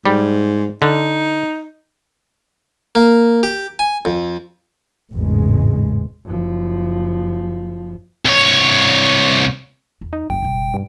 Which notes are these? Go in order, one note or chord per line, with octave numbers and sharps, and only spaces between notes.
G#2 G3
D3 D#4
A#3
G4
G#5
F2
G#1 E2 A2 C#3 G#3
F#1 F3
C2 C#5
E2
D#4
F#1 F#2 C#3 G5
B2 G3
G2